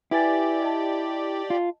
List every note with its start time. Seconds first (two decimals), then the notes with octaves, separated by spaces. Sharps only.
0.11 E4 G4 B4 D5 G#5 A6
0.62 D#5 A5
1.50 F4